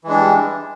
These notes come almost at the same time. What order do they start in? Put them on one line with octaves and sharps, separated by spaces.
E3 G#3 D4 G3